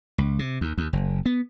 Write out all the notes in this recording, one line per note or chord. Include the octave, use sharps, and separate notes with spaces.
C#2
C3
D#2
D#2
F#1
B3